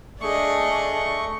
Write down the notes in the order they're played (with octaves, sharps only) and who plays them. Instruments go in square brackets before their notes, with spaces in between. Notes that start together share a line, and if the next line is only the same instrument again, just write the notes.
[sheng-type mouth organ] A3 C#6 [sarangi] D4 [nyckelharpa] G#4 D#5